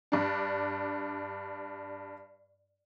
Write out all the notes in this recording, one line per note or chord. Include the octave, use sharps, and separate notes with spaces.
G2 D4